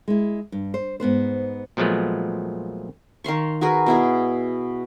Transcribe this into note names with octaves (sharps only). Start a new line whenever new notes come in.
G#3 E4
G2
C5
G#2 B3 B4 C5
A#2 F3 F#3 G#3 A3 B3
D#3 F5 C6 C#6
F#4 G#4 A#4 B4
B2 E4 G#4